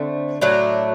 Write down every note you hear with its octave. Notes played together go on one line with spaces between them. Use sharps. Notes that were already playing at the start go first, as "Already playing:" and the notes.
Already playing: D3 A3 C4
A2 F#3 A3 D4